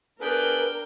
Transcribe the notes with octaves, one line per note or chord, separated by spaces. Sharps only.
B3 D4 G#4 A#4 B4 G5